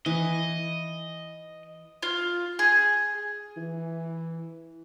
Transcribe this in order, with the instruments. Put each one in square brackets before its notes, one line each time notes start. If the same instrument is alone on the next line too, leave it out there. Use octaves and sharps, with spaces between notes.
[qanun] E3 [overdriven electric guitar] D#5
[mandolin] F4
G#4
[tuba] E3